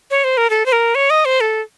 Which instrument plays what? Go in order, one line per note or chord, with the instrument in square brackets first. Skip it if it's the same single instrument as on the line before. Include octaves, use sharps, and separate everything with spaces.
[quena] C#5
C5
A#4
A4
C5
A#4
C#5
D#5
C5
A4